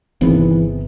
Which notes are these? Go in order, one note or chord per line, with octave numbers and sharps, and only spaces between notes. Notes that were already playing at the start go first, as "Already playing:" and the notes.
G1 C3 D#3 E3 B3 G#4